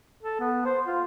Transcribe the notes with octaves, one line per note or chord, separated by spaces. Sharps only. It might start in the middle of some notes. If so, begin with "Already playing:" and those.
A4
B3
C5
F4